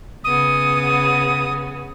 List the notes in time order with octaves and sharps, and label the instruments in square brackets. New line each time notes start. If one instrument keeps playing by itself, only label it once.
[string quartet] C#3 B3 [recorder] D#6